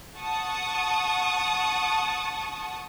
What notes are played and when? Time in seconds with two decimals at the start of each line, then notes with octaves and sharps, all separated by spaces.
0.17 F#5 A5 C#6 D#6